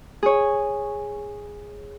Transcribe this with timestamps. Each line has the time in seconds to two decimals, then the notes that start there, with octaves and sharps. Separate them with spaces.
0.23 G#4 C#5